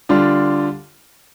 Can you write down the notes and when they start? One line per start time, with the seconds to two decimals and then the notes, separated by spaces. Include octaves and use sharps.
0.09 D3 G3 D4 F4